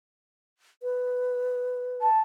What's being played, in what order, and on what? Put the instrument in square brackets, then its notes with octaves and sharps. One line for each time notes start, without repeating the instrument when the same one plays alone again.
[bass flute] B4
[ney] A5